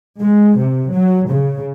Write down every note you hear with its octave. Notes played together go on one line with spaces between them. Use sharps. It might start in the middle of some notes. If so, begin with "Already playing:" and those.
G#3
C3
F#3
C#3